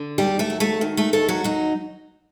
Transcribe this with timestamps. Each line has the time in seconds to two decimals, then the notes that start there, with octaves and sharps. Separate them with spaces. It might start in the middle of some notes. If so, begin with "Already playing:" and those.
Already playing: D3
0.18 D#2 G3 G4
0.39 A3 A4
0.50 F#3
0.60 A3 A4
0.81 D#3
0.97 A3 A4
1.13 D#2 A3 A4
1.29 F#3 F#4
1.44 F#3 D#4